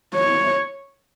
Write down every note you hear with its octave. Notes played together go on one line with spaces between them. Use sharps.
C#5